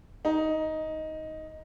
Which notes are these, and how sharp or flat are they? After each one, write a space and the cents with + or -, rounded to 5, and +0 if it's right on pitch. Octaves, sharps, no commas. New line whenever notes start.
D#4 +10